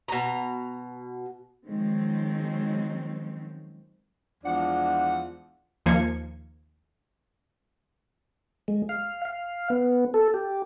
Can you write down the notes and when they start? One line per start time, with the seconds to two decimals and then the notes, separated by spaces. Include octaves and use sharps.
0.08 B2 A#5
1.67 D#3 F3 F#3 G#3 C4 C#4
4.44 E2 F3 G#3 D4 F#5
5.86 D#2 F3 A#3 G#6 C#7
8.68 G#3
8.89 F5
9.25 F5
9.70 B3
10.14 A4
10.34 G4